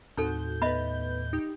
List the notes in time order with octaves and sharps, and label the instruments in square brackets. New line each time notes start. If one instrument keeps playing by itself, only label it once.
[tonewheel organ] D#2 A2 G6 [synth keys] C4 F#4 [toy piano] D#4 A4
[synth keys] B3 B4 [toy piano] D#5 E5 B5
[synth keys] D#4 G4